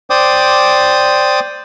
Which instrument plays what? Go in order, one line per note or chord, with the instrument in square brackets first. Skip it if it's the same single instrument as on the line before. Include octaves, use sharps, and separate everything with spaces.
[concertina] C5 D5 G5 D6 D#6